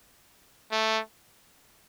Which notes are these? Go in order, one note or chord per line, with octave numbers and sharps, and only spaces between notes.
A3